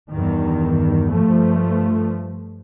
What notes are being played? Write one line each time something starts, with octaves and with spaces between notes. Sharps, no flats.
E2 G2 D#3
G2 F3 A3